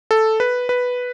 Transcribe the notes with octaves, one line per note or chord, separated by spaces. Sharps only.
A4
B4
B4